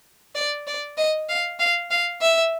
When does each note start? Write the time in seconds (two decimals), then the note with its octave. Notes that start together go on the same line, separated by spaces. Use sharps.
0.35 D5
0.67 D5
0.97 D#5
1.29 F5
1.59 F5
1.91 F5
2.21 E5